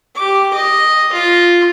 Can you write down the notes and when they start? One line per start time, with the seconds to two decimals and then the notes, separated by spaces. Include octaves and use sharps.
0.15 G4 D6
0.53 D#5
1.13 F4